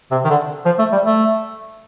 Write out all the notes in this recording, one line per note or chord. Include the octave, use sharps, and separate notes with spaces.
C3
D#3
D3
F3
A3
G3
A3